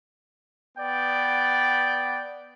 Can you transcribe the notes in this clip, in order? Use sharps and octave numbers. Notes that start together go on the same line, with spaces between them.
B3 D5 G5